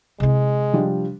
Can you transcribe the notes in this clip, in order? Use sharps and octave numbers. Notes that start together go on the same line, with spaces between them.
C3 G#3 E4
F3 G3 D4